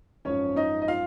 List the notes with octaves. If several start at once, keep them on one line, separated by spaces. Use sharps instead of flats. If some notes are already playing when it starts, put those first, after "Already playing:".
G#1 F#2 F3 C#4 C#5
D#4 D#5
D#5
F4 F5